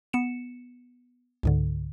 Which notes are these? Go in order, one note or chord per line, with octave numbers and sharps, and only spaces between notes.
B3 C#7 E7
C#2 G#2 D3